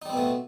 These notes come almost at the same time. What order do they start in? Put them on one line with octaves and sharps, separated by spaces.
D#4 G3 C4 B2 A3